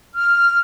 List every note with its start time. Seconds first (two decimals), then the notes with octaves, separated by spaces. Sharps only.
0.14 F6